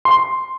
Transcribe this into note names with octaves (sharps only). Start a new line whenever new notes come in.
C6